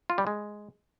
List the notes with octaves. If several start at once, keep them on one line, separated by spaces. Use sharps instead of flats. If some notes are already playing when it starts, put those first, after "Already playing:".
F4
G3
G#3